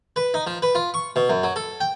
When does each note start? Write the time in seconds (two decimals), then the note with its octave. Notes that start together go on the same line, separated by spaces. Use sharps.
0.16 B4
0.34 D#4
0.47 F3
0.62 B4
0.75 F4
0.94 C#6
1.16 B2
1.30 F#2
1.43 F#3
1.56 A4
1.81 G5